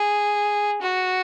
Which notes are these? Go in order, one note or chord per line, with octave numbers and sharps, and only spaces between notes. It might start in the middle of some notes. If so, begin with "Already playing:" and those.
Already playing: G#4
F#4